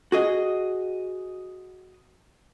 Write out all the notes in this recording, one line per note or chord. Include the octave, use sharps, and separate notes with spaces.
F#4 G#4 D#5